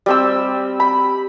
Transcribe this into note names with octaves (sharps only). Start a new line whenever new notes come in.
G3 C4 E6
B5